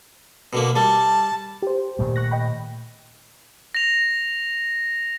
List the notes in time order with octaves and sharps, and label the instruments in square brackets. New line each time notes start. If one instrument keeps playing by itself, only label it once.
[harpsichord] B2 D3 A#3
[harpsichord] G3 [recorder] A5
[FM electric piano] G4 C5
[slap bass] A#2 D#3 A3
[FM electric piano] C#6 F#6 A#6
D#5 G5 B5
[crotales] A#6 F7